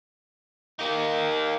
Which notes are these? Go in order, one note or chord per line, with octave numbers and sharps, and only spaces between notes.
A#3 D#4